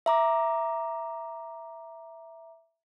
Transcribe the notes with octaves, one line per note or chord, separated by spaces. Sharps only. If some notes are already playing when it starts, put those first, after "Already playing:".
E5 A#5 D6